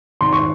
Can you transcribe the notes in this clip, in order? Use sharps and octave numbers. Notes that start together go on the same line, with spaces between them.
G#1 C6
C#6